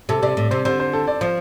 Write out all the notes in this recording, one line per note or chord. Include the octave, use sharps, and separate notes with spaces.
C3 A4
C3 D5
A2
C3 C5
D3 C5
C5
A4
D5
F3 C5